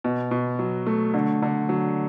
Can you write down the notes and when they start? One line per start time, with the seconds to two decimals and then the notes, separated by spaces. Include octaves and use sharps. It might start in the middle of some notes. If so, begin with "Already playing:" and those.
0.04 B2
0.31 B2
0.59 F#3
0.87 A3
1.14 D3
1.43 D3
1.69 F#3